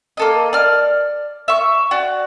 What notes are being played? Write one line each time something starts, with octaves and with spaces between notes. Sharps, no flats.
A#3 A4 D#5
D5 F6
E5 C#6
F#4 D5